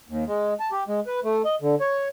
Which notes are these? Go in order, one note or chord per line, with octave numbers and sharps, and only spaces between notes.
D#2
G#3
A5
G4
G#3
B4
A3
D#5
D3
C#5